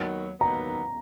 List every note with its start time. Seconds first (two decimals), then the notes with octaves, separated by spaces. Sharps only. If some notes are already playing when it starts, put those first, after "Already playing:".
Already playing: D#2 D#3 F#3 B3
0.40 D#2 D#3 F#3 B3 A#5